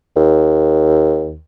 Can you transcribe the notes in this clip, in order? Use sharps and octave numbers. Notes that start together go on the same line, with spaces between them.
D#2